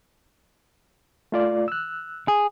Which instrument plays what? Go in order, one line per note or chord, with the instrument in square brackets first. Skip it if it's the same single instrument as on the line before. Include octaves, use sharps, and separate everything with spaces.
[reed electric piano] A3 F4 D5
E6 F#6
[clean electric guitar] G#4